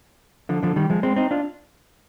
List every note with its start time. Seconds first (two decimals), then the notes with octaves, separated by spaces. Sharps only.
0.49 D3 F3
0.63 D3 F3
0.76 D#3 G3
0.90 F3 G#3
1.03 G#3 C4
1.16 C4 D#4
1.31 D4 F4